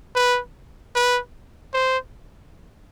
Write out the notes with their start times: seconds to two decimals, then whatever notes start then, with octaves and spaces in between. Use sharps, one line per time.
0.15 B4
0.95 B4
1.74 C5